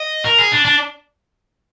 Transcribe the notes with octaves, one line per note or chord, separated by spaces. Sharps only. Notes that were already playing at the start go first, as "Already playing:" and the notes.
Already playing: D#5
A#4
G#4
D4
D4